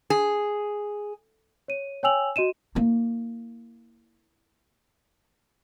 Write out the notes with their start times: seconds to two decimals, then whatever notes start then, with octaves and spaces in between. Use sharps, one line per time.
0.10 G#4
1.68 C#5 D#7
2.03 C#5 G5 G#5 E6 F7 F#7
2.36 F#4 D#5 D#7 E7
2.75 A#3 E4